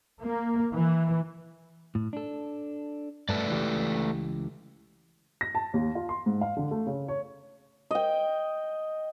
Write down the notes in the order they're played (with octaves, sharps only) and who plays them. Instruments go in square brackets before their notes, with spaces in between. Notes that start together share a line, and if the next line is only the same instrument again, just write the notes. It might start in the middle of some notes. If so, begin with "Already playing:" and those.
[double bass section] A#3
E3
[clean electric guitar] A2
D4 A4
[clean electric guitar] G2 A5 [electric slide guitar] A3 B4 D5
[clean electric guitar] C#2 E3 G4
[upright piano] A#6
A5
D#2
F4
C6
G#2
F5
D3
A3
C#3
C#5
[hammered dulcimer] D#5 G5